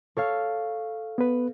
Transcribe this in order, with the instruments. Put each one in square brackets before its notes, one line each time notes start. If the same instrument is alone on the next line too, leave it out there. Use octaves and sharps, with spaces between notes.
[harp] A4 C#5 F5
[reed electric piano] B3 B4